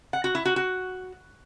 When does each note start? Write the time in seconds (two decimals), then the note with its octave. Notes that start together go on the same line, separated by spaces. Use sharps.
0.13 F#5
0.24 F#4
0.35 E4
0.45 F#4
0.56 F#4